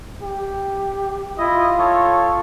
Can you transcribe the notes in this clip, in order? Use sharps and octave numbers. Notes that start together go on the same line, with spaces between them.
G4
E4 F4 D#5
A4 C#5